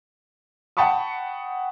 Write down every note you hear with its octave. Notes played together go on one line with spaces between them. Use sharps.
F#5 G5 A5 B5 C#6 D#6